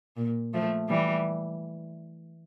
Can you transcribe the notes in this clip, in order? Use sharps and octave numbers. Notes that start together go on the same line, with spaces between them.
A#2
F3 A3
E3 G3